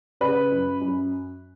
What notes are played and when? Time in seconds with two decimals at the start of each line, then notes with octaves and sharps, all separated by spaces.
0.21 C#3 B4
0.51 F#2
0.81 F#2